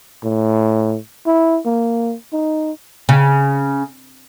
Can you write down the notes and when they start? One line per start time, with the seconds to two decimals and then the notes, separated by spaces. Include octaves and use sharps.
0.24 A2
1.26 E4
1.66 A#3
2.33 D#4
3.09 C#3